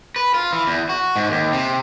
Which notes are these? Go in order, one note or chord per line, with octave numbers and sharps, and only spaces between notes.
B4
F4
E3
E2
F#4
G#2
D#2
C3